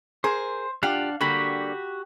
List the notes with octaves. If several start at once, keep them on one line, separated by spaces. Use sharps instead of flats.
G#4 A#4 C5
D4 F4 G4 F5 F#5
D3 G3 A#3 F#4 G4 B5